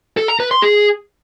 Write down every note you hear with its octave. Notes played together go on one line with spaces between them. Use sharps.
A4
A#5
B4
C6
G#4